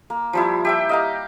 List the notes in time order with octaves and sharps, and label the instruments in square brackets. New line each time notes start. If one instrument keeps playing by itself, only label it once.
[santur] A#3
F3 G3 E4
G4 E5 G5
D#5 F5 A#5